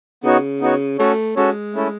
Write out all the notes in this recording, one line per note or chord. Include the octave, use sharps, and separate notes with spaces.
C#3 B3 D#4 F#4 C#5
B3 D#4 F#4 C#5
A3 C#4 F#4 A4 C#5
G#3 C#4 F#4 A4 C#5
A3 C#4 E4 A4